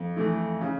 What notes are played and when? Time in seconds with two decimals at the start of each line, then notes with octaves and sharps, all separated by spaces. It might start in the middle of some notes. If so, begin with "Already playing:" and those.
Already playing: F2
0.16 E3 A3 E4
0.61 C#3